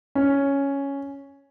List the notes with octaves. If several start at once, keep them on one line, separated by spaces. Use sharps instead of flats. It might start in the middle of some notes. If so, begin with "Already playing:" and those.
C#4